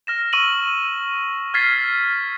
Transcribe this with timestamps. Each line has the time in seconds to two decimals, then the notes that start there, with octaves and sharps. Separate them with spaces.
0.07 F6 A#6 E7
0.33 C#6 E6 D#7 F#7
1.54 F6 G#6 A6 B6 C7